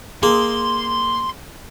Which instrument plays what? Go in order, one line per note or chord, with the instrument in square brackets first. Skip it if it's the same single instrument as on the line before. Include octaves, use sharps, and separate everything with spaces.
[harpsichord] A#3 [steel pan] G#4 [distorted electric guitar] C6